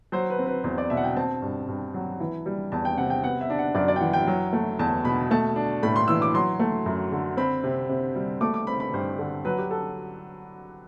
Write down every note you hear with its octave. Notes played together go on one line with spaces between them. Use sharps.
F#3 C5
B4
C4
B4
E2 C5
D5
B2 E5
F#5
G5
C4 A5
G2
G2
F#3
E3
G3
E2 A5
G5
C3 F#5
G5
B3 F#5
E5
D4
F#5
F#2 D5
D5
G5
E3 F#5
G5
F#3
A3
E2 A5
B2 B5
A3 A5
D4
A2 B5
C6
E3 E6
D6
F#3 C6
A3
F#2
D3
C4 B5
C3
C3
G3
A3 D6
D6
C4 B5
B5
G2 C5
D3
F#3 B4
G4
A4